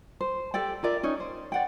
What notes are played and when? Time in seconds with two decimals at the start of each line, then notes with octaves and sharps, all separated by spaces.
0.21 C5
0.54 G4 A4 D5 G5
0.83 F4 A#4 D5 E5
1.03 C#4 D#4 C#5
1.20 C5
1.52 D5 F#5 G5